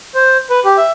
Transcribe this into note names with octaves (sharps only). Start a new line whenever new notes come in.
C5
B4
G4
E5